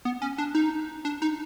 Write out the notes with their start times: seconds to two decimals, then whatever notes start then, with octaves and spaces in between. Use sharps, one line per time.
0.05 B3
0.22 C#4
0.38 D4
0.55 D#4
1.05 D4
1.22 D#4